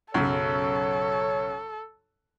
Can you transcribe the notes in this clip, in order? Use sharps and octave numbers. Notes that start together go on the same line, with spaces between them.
B1 F#2 C#3 A4 C#5